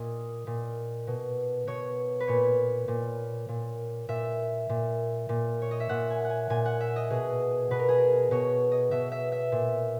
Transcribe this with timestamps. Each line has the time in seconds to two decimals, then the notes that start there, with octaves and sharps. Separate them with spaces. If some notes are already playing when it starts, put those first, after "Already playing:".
Already playing: A#2 D#5
0.47 A#2
1.07 B2
1.67 B2 C#5
2.20 B4
2.27 A#2 C#5
2.88 A#2
3.48 A#2
4.09 A#2 E5
4.69 A#2
5.29 A#2
5.62 C#5
5.71 D#5
5.80 E5
5.89 A#2 F#5
6.10 G#5
6.24 F#5
6.30 G#5
6.50 A#2 G#5
6.65 F#5
6.81 E5
6.96 D#5
7.10 B2 G#4
7.71 B2 B4
7.79 A#4
7.89 G#4
7.98 A#4
8.31 B2 C#5
8.72 D#5
8.91 B2 E5
9.12 E5
9.32 E5
9.52 A#2